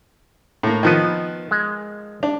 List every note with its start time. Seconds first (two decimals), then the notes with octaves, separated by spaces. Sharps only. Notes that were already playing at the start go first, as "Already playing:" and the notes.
0.63 A2 A#3
0.83 D#3 F3 B3 D#5
1.51 G#3
2.23 D4